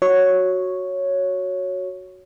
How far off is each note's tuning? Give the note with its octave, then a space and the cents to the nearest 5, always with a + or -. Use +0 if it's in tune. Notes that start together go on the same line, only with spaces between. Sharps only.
F#4 +0 C#5 +0